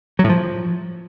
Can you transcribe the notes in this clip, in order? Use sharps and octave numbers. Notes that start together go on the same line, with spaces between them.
F#3
A2
F3